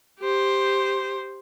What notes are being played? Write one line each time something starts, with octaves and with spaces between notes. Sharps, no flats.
G4 C5